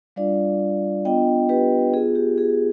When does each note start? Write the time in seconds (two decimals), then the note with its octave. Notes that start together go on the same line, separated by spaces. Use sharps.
0.16 G3 D4 F4 D5 F5
1.05 B3 D4 F4 D#5 G5
1.49 G4 B4
1.94 B3 F4 G#4
2.15 G4
2.38 G#4